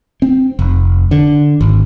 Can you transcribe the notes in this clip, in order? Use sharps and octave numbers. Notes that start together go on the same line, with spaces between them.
C4
F1
D3
G#1